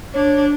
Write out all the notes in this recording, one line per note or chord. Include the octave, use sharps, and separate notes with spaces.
D4 C#5